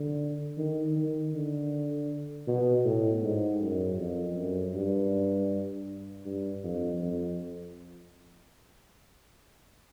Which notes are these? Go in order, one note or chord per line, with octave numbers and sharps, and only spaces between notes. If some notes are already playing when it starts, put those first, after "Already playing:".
Already playing: D3
D#3
D#3
D3
B2
A2
G#2
F#2
F2
F#2
G2
G2
F2
F2